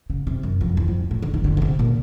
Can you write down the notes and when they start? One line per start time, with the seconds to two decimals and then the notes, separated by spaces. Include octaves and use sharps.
0.10 C#3
0.27 C3
0.43 F#2
0.61 F2
0.77 E2
0.88 F2
1.11 A2
1.22 D3
1.34 D#3
1.44 D3
1.57 B2
1.62 C3
1.79 A#2